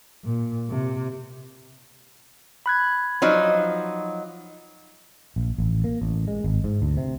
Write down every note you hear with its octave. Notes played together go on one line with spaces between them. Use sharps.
A#2
C3
B5 F#6 G#6
F3 F#3 D#4
A#1
A1
A#3
A1
G#3
G#1
G#2
D2
C3